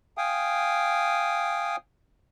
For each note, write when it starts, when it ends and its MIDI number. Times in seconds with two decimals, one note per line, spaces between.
0.17 1.76 77
0.17 1.76 79
0.17 1.76 80
0.17 1.76 87